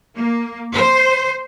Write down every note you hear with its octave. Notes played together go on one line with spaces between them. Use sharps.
A#3
C5